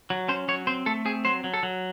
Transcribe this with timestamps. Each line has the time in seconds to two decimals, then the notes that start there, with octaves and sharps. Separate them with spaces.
0.10 F#3
0.28 C#4 C5
0.48 F#3 C#5
0.67 C4 C5
0.86 A3 A4
1.05 C4 G#4
1.25 F#3 C5
1.44 F#3
1.54 A4
1.63 F#3